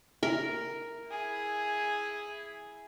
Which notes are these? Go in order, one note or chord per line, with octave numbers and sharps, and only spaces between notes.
A#4
E4 G#4